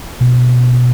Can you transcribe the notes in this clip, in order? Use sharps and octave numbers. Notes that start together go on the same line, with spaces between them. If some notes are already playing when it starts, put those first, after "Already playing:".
B2